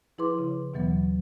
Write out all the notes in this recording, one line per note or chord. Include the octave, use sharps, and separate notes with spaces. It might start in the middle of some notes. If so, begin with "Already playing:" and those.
F3 E4 G#4 B4 C6 D6
C#3
D#2 B2 E3 F#3 B3